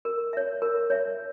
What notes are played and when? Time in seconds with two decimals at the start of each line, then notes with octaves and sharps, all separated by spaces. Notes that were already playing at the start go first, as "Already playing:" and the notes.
0.05 A#4
0.33 C#5 E5
0.62 A#4
0.90 C#5 E5